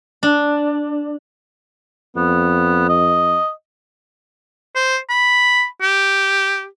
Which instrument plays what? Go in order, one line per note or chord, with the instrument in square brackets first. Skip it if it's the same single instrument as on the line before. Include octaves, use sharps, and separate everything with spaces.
[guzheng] D4
[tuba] F2 [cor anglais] B3
[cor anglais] D#5
[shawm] C5
B5
G4